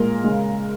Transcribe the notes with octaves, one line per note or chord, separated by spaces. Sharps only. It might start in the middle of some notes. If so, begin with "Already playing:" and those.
Already playing: A#2 G#3 A#4
C#3 G#3